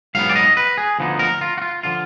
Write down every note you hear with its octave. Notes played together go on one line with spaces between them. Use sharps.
G#2 F#3 B3 F5
D5
D#5
B4
G#4
D2 D3 F3 B3 D#4
A#4
F4
F#4
F4
D3 F3 F4